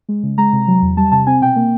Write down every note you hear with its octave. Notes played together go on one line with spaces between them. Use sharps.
G#3
C#3
G#3 A#5
C3
F#3
E2
G3 A5
C3 A5
C4 G#5
B2 G5
A#3